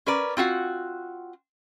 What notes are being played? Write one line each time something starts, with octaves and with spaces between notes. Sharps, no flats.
C#4 A#4 B4 D5
C4 F4 F#4 F#5